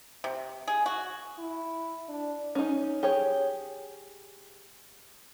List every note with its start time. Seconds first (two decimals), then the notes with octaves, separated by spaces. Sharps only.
0.24 C3
0.67 G#4
0.86 F#4
1.39 E4
2.09 D4
2.55 C#4 D#4
3.03 G4 G#4 C#5